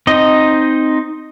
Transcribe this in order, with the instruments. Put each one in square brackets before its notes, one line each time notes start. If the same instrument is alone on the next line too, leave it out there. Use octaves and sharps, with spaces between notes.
[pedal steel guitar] C4 D#4 D#5